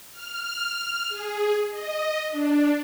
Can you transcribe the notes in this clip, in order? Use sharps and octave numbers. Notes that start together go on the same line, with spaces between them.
F6
G#4
D#5
D4